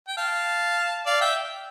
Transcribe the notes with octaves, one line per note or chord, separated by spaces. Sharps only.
G5
F5 A5
D5 F5
E5 G5